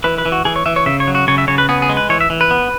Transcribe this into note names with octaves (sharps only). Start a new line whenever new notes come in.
E3 B4
B4
E3
F#4
E3 G#4
C#5
E3 E5
C#5
C#3 E5
C#5
F#3
F#4
C#3 C#5
E5
C#3 C#5
B4
B3 G#4
G#4
G#3
B4
E3 C#5
E5
E3
B4
B3